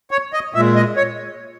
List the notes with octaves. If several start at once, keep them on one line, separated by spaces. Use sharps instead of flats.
C#5
D#5
A#2 G#3 E5
D#5
C#5